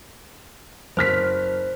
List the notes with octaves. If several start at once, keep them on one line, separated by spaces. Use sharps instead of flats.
F#1 C5 F6 B6